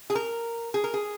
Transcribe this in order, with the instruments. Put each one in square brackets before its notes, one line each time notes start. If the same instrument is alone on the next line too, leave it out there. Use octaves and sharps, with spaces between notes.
[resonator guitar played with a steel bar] G#4
A#4
G#4
A#4
G#4